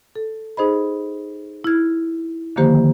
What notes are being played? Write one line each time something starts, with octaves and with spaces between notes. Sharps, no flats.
A4
D#4 G#4 C5 D#5 B5
E4 F6 G#6
D3 D#3 F3 A#3 G4 C5